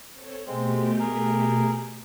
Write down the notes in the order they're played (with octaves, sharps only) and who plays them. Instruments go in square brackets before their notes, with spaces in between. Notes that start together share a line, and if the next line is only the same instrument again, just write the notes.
[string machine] C4 A4 C#5
[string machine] B2 A3 G4 [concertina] G#3 C4
[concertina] G#4 A#4